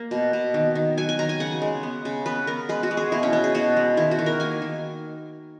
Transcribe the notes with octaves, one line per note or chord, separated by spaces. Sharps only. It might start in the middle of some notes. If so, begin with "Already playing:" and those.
Already playing: A#3
B2
B2
D#3
D#3
F#3 G#5
G#5
D#3 A#5
G#5
C#3 F#5
G#3
B3
C#3
B3 B4
B3 A#4
G#3 B4
F#4
G#3
G#4
B2 E4
C#4
B3
G#4
B2 F#4
G#3
D#3 E4
F#4
D#3
A#4
A#3 G#5
D#3